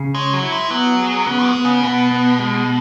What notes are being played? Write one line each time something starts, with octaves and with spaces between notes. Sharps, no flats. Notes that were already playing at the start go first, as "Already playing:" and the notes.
Already playing: C#3
G#3 C#5
F#3
E4
G#3
F#3 B3
G#4
C#3 B3
G#3
B3
C#3
B2 B3
B3
G#3